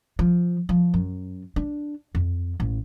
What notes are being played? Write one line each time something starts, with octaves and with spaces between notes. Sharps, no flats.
F3
F3
F#2
D4
F2
A1